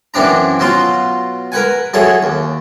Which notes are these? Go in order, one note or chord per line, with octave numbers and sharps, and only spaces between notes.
F#2 E3 C4 D4 A#5
B2 F#3 F4 C6
A#4 B4 F#5 G#5
F#3 E4 G#4 A4 C#5
D#2